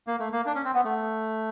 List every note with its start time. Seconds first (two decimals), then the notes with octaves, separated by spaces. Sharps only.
0.07 A#3
0.20 A3
0.32 A#3
0.46 D4
0.55 C#4
0.65 C4
0.74 B3
0.85 A3